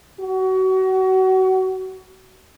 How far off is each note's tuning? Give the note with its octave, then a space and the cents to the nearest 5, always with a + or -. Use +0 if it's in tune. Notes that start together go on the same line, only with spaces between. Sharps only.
F#4 +30